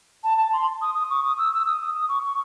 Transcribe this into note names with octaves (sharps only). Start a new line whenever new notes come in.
A5
A5
C6
D#6
D#6
C#6
D#6
E6
E6
D#6
D#6
C#6
C#6